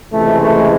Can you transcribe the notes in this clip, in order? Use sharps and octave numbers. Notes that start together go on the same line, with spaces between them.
C#2 C3 E3 G#3 A3
A3